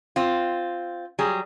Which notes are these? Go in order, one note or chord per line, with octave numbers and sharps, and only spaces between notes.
C4 F4
F#3 G3 G#4